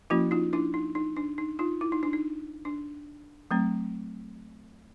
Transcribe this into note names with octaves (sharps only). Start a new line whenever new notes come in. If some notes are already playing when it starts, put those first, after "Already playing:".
F3 A#3 C#4 E4 F#4
D#4 F4
D4 E4
D#4
D#4
D4
D#4
D#4 F4
E4
D#4
D4
D#4
D4
F#3 A3 C4